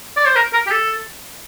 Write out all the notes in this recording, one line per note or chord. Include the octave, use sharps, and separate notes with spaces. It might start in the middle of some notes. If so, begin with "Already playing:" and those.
D5
C5
A#4
A#4
G4
A4